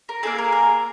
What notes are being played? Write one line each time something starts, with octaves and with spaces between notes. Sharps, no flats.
A#4
A#3 D#4 G#4 A4
A#4
A#4